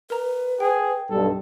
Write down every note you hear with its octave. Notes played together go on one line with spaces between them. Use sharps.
A#4 B4 A#5
G#4 G5
B1 G2 A4